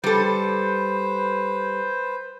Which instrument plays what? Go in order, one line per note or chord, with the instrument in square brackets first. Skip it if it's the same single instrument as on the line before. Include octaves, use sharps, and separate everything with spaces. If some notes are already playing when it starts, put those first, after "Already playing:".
[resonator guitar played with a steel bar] G3 A4 [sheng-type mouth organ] B4 C5